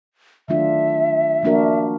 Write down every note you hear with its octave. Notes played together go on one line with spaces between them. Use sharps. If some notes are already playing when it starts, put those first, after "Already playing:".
D#3 F#3 A3 D4 F4 E5
F3 A#3 D4 F#4 A#4